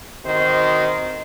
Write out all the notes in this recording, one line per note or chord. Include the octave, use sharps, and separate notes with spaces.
D#3 C4 F#4 C5 D#5